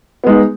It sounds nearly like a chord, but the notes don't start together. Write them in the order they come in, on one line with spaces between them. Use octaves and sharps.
B3 G#3 D#4